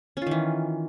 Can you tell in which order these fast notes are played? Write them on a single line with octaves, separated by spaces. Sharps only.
C#4 F4 D#3 E3